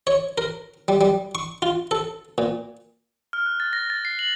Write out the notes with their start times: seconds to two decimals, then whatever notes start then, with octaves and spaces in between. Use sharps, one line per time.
0.07 C#5
0.38 A#4
0.88 G3
1.01 G3
1.35 C#6
1.62 F4
1.91 A4
2.38 A#2
3.33 F6
3.46 F#6
3.60 A6
3.73 A#6
3.90 A6
4.05 C7
4.19 F#7